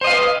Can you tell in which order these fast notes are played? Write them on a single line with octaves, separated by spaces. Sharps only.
C5 D#5 F5 B4